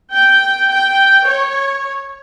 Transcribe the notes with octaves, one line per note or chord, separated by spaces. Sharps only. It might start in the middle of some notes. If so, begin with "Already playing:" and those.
G5
G5
C#5